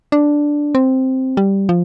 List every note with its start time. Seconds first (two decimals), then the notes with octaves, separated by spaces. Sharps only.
0.12 D4
0.75 C4
1.37 G3
1.69 F3